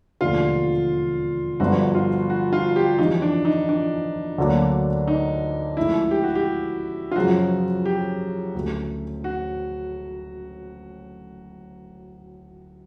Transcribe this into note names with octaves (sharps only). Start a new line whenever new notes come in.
E1 D#2 D3 F3 A3 F4
G1 G2 D3 F3 F#4
F4
F#4
F4
G4
F2 C#3 E3 D#4
D4
D#4
D4
D2 D3 F#3 A#3 D4
D#4
C#2 C#3 F3 A3 E4
G4
F#4
G4
F4
F#2 C#3 F3 F#4
G4
D2 C#3 F#3 A3
F#4